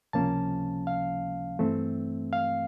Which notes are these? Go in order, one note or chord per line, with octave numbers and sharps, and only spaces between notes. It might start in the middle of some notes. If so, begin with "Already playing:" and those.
C#2 C3 F3 A#3 C#4 A5
F5
G2 E3 A3 C4
F5